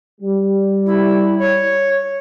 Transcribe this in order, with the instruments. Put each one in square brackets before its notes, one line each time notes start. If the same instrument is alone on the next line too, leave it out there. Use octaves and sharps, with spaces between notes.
[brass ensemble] G3
[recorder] E4
C#5